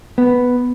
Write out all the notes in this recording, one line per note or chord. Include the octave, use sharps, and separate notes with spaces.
B3